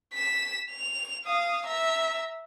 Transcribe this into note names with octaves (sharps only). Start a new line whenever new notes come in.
B6 E7
F7
F5 D#6
E5 A#5